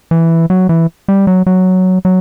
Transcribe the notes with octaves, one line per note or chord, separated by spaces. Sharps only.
E3
F#3
E3
G3
F#3
F#3
F#3